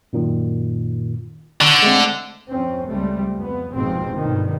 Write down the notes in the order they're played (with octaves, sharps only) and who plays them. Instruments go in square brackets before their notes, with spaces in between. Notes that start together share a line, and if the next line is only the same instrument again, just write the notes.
[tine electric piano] F#2 A#2 D#3
[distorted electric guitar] D3 [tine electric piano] C#6
[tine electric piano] G#3 A3 C4
[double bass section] F2 C4 C#4
C#2 G3 A3 C4
F2 B3
F1 D#2 G#2 B2 F3 C4
G1 B2 D3 D#3